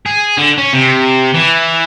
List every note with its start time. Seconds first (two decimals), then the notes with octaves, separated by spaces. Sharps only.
0.06 G#4
0.38 D3
0.58 C#4
0.73 C3
1.34 E3